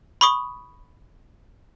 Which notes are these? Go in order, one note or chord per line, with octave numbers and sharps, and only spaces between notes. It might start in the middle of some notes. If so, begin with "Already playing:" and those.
B5 C#6 D#6